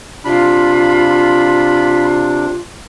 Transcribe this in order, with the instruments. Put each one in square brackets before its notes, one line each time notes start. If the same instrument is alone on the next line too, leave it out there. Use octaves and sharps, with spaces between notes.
[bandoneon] C3 D4 [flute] F4 [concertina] B5